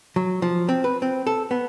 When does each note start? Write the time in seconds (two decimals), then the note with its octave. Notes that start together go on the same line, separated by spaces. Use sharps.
0.16 F#3
0.42 F3
0.69 C4
0.84 B4
1.02 C4
1.27 A4
1.51 B3